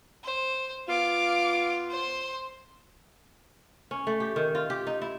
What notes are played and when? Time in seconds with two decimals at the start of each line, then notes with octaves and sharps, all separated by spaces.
0.24 C5
0.88 B3 F4 F5 D6
1.90 C5 C6
3.91 C#4
4.07 A3
4.20 G4
4.36 D#3
4.55 F4
4.70 G4
4.87 D#4
5.02 E4